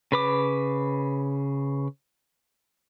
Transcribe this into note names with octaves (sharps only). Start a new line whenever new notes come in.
C#3 B4 D6